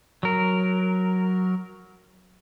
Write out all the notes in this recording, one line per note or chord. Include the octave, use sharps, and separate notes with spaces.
F#3 A#4